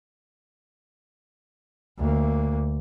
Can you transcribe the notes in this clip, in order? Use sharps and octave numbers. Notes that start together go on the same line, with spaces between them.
D2 A#3